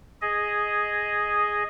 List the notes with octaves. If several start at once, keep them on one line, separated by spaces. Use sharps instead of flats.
G#4 D#5